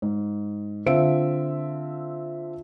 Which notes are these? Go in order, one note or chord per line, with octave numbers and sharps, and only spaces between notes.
G#2
D3 C4 F4 E5 D7